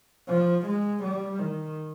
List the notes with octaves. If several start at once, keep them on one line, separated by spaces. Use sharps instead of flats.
F3
G#3
G3
D#3